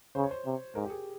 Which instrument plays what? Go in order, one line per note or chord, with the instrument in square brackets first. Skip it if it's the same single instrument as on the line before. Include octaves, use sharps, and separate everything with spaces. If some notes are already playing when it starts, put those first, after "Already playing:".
[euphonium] C#3 [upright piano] C5
[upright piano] C#5
C5
[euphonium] C3
[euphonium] G#2 [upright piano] A#4
[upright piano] G4
G#4